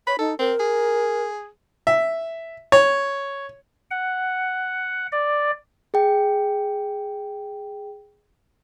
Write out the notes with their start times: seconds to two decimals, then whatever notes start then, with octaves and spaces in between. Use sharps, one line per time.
0.07 C#5 B5
0.19 D#4 A4
0.39 C4 A#4
0.60 G#4
1.87 E5
2.72 C#5
3.91 F#5
5.12 D5
5.94 G#4 G5